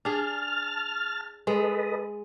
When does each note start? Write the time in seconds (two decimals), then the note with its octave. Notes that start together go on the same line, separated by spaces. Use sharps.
0.05 D4 G#4 A5 F6
1.47 G#3 A4 B4 D#5